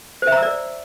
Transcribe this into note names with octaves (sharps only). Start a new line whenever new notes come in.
C5
E5
A#5
E6
D5